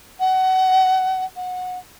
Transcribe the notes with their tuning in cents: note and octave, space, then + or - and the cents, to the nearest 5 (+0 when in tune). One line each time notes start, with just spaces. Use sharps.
F#5 +25
F#5 -20